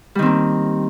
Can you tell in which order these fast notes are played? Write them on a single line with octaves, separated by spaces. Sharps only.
G3 D#3 C4 A#3